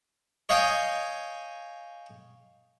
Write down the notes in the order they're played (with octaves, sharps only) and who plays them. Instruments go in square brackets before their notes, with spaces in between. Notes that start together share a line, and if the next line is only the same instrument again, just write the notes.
[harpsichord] C#5 D#5 F5 G5 G#5 D#6